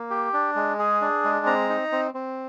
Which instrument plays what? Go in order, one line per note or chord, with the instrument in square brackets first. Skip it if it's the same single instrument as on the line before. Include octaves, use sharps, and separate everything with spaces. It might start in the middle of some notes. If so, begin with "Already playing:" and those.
Already playing: [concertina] A#3
G4
D4
G#3
G#4
D4
G#3
C4 A#5
D#4
C4
C4